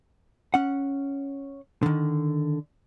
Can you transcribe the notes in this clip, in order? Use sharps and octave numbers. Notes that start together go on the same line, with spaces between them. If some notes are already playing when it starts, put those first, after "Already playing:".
C#4 F#5
D3 D#3